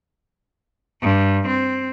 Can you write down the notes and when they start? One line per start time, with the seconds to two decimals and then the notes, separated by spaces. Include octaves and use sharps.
1.02 G2
1.47 C4